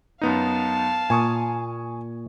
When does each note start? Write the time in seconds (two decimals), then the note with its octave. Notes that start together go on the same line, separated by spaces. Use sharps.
0.21 F#2 B3 D#4 F5 A5
1.10 A#2 G#5 C#6 D#6